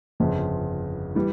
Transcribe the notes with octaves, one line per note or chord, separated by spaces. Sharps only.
G1 F2 C#3
E3 G3